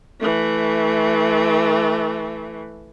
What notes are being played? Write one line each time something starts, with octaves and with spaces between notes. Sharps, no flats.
E3 A3